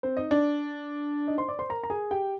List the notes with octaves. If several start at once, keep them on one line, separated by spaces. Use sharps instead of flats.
C4 C5
D#4 D#5
D4 D5
D#4 D#5
C5 C6
D5 D6
C5 C6
A#4 A#5
A#5
G#4 G#5
G4 G5